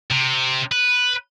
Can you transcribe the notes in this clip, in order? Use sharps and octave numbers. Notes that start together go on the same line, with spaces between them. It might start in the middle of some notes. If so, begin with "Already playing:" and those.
C3
B4